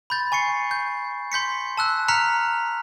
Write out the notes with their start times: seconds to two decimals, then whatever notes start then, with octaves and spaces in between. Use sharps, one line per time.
0.10 B5 C6 G6 A6
0.32 G#5 C#6 C7 C#7
0.71 G6
1.32 C6 G6 B6 C#7
1.78 A5 E6 F#6
2.08 A#5 F6 F#6 B6 C#7 F7